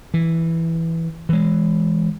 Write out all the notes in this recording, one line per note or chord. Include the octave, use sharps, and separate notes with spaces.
E3
E3 G#3